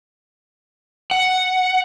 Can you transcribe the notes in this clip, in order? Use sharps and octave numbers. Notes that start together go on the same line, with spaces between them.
F#5